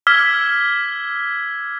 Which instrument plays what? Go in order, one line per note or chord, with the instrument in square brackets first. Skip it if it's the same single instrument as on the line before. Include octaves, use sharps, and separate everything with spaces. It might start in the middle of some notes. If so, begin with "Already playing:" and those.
[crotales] D6 E6 F6 G#6 B6 G7